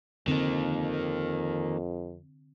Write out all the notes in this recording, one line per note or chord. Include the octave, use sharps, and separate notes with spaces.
F2 D3 D#3 A#3 C4